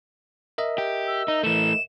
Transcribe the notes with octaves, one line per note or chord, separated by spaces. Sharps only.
A#4 D#5 E5
G4
E6
D#4
E3 A3 E7